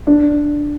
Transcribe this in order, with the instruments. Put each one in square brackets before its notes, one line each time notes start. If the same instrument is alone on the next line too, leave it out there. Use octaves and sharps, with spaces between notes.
[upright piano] D4